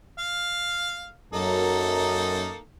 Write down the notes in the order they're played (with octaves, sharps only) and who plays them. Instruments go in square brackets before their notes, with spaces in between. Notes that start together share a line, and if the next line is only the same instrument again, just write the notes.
[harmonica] F5
[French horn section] F#2 [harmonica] A#3 D#4 A4